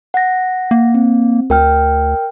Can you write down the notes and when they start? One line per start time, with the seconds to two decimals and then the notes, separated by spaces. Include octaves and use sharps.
0.14 F#5 A#6
0.71 A#3
0.94 C4
1.50 D2 A#4 G5 F6